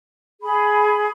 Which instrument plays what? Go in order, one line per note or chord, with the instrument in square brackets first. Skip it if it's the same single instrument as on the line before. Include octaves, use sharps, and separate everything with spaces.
[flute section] G#4 B5